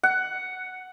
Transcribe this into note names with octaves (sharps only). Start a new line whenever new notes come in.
F#5